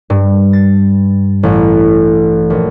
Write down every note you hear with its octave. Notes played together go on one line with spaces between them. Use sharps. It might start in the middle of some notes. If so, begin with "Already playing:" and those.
G2
A6
A1
A#1